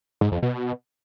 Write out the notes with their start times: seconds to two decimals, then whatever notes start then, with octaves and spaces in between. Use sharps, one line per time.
0.21 G#2
0.32 F2
0.43 B2